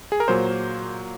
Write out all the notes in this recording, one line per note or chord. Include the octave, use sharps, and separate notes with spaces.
G#4
A#4
A#2 F#3 A#3 C5